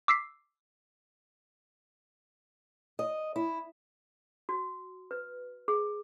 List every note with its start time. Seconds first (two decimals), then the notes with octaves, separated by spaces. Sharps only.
0.08 D6 E6 B6 C7
2.99 D#5
3.36 E4
4.49 F#4
5.11 B4
5.68 G#4